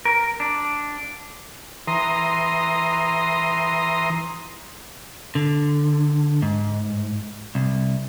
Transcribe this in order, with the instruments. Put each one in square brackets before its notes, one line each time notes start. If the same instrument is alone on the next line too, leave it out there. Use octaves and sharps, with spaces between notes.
[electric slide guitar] A#4
D4
[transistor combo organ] E3 A#5 C6 D#6
[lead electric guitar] D3
G#2
C2